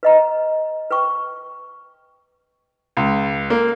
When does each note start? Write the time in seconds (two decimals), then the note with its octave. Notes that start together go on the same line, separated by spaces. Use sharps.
0.03 B4 D#5 A#5
0.91 B4 G5 C#6
2.97 C#2
3.50 A#3